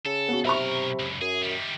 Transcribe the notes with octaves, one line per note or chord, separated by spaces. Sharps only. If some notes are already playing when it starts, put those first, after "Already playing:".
C#3 A4
B3 F#4
B1 C3 A#4 E5 B5 C#6
C#2 F#2
F#2 G#4
D#3 G3